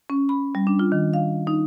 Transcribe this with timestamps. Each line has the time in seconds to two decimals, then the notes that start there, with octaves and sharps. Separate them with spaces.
0.10 C#4
0.29 B5
0.55 G3
0.67 D4
0.79 F4
0.92 D#3
1.14 F5
1.47 D#4